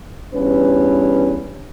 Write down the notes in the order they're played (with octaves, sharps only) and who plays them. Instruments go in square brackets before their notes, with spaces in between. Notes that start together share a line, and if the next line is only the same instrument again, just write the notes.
[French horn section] E2 G2 C#4 B4